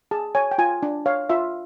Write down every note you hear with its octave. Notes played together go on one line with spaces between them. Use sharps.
G#4 A5
C#5 G#5
G5
F4 G#5
D4
C#5 F5
F4 E5